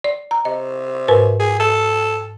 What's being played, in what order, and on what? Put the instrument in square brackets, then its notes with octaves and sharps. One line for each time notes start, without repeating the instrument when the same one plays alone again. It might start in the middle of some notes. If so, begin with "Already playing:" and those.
[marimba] D5
A#5
[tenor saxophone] C3 [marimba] D#5
[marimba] G#2 A#4 B4
[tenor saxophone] G#4
A4